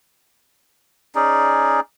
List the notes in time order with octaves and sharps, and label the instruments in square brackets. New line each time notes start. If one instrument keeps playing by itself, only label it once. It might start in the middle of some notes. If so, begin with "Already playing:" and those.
[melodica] C#4 D#4 G#4 D5